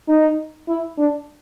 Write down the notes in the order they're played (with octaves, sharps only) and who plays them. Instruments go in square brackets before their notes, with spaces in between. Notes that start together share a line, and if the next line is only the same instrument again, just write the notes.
[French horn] D#4
E4
D4